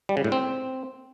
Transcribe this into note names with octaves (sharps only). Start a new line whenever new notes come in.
G3
C#3
A2
C4